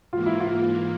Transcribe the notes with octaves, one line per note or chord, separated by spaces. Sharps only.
G#2 E3 A#3 F4
E4
F4